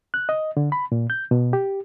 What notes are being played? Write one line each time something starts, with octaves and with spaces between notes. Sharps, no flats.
F#6
D#5
D3
B5
A#2
G6
B2
G4